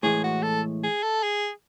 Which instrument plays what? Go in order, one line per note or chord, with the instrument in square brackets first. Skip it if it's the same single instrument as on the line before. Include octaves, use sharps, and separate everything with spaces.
[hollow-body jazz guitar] A2 E3 G#3 [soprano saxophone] G#4
[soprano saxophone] F#4
A4
G#4
A4
G#4